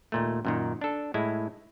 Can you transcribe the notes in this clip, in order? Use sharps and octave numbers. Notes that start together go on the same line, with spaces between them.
D#2 A#2 A3
F#2 A#2 D#3
D4 A4
A2 G#3 E4